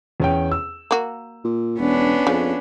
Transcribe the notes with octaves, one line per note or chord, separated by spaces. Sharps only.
E2 C#4 G5
E6
A#3 F#4
A#2
E1 B3 C#4 D4
F2 C#3